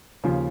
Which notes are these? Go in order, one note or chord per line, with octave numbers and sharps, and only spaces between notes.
D#2 C#3 F3